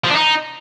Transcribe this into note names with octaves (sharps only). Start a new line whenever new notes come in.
F3
D4
D#4